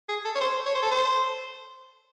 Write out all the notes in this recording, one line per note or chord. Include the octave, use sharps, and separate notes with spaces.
G#4
A4
C#5
C5
C#5
C5
A4
C5